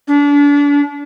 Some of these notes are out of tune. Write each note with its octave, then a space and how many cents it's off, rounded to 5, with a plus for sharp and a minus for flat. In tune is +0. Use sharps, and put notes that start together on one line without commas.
D4 -35